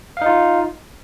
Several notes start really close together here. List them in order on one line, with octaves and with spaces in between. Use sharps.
F5 D#4 F4